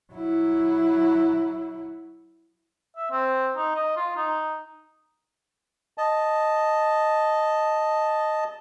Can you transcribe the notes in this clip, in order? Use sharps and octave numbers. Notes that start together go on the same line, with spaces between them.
F#3 E4
E5
C4
D#4
D#5
F4
D#4
D#5 A5